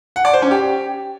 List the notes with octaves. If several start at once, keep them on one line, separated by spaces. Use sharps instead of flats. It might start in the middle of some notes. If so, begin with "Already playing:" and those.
F#5
D5
C5
C#4
G4